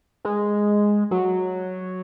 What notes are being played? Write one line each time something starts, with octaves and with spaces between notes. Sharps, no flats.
G#3
F#3